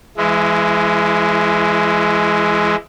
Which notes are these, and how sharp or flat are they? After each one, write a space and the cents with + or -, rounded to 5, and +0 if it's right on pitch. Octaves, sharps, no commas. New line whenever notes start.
E3 +40 G#3 +10 E4 +0